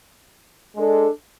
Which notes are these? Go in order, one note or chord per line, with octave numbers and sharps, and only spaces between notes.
G#3 D4 A4